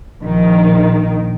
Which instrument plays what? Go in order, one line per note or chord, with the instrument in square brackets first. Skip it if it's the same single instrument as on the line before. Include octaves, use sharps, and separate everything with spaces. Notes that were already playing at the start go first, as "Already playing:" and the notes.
[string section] A#1 D#3